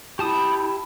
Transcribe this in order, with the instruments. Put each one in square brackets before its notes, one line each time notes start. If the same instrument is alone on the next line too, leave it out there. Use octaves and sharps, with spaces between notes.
[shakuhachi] E4 [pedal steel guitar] G4 A5 D#6